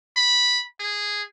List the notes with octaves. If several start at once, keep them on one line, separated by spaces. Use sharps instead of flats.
B5
G#4